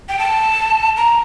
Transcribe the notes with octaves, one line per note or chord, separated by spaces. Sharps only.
G5
A5
A#5